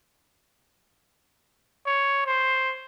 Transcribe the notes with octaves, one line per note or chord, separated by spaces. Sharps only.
C#5
C5